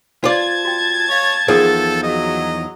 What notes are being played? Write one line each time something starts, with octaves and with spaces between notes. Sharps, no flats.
F4 B4 C5 D5 A5 G#6
F#4 G5
C#5 E5 F5
E2 D#3 F3 G#4 A4
F#3 D#5